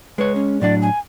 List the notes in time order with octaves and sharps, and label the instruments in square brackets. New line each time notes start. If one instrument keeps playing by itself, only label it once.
[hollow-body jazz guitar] G#3 C#5 [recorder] B4
[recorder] C#4
[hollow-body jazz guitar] A2 F#3 D4 [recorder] D5
[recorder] G#5